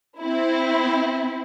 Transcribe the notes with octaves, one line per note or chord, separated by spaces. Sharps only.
C4 E4